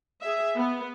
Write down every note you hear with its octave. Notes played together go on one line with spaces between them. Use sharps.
G#4 E5
B3